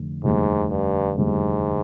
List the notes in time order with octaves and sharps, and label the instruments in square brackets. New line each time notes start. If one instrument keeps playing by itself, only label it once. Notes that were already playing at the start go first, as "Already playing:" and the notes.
Already playing: [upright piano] F1 D3
[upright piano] F1 D#2 D3 G3 [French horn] G#2
[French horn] G2
[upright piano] F1 D#2 D3 G3 [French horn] G#2